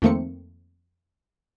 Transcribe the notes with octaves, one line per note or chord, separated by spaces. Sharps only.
F2 D#3 A3 A#3 C4 C#7